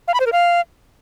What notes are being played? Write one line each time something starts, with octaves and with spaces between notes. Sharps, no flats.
F5
B5
C5
A#4
F5